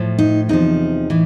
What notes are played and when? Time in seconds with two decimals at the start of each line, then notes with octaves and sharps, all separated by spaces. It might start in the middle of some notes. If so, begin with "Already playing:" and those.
Already playing: A2 F3
0.18 D#4
0.49 E2 C3 F3 D#4
1.10 A2 E3